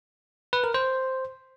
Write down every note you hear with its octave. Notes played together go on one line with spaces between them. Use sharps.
B4
A#4
C5